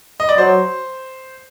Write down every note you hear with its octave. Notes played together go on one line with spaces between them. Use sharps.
D#5
D5
F#3 C5